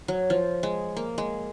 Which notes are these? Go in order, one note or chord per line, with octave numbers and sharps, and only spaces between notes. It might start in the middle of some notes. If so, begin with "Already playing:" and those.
F#3
F3
G#3
A#3
G#3